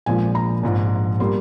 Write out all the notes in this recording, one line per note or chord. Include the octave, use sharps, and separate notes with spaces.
A#1 A#2 F3 G#3 G#5
A#5
A#1 G#2 F3 G#3
G3 A#3 C6